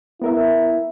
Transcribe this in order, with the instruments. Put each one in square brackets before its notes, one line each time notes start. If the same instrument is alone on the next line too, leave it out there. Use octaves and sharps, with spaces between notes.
[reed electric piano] B3 A#4 E5 [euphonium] E4